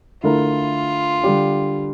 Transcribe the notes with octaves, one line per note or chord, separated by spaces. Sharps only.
D3 A3 E4 F4 A#4
D3 G3 D4 G4